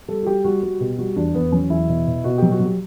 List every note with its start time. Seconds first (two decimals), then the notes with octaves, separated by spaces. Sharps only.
0.08 G3 A4
0.23 F#4
0.27 G3 G4
0.44 G3 F#4
0.62 G3 F#4
0.80 B2 G4
0.98 G3 F#4
1.16 E2 D4
1.35 E2 B3
1.52 F#3 C#4
1.70 E2 E4
1.88 B2
2.06 B2
2.24 B2 F#4
2.38 F#3 G4
2.51 F#4
2.60 F#3 G4